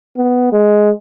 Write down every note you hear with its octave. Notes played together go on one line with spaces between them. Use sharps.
B3
G#3